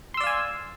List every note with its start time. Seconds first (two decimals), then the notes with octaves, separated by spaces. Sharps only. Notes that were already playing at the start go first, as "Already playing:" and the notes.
0.14 C6
0.17 E6
0.20 D5
0.24 F5
0.27 G#5